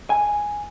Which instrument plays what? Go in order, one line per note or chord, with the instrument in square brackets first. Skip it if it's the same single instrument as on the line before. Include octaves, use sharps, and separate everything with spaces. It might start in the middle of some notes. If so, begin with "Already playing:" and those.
[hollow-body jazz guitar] G#5